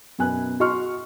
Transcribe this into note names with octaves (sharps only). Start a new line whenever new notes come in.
F#2 B2 B4 G#5 F#6
F#4 D#5 C6 C#6 F6